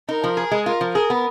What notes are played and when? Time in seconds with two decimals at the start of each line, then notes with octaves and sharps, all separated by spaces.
0.09 D#4 A#4
0.24 F3
0.37 G#4 A#4
0.51 G#3
0.66 F4 A#4
0.81 F3
0.95 G#4 A#4
1.10 B3